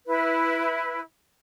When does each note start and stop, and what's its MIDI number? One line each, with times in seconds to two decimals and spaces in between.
0.06 1.00 64
0.06 1.00 71